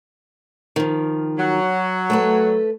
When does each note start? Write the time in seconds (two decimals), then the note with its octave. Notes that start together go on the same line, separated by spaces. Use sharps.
0.76 D#3 F3
1.38 F#3
2.10 A3 A4 B4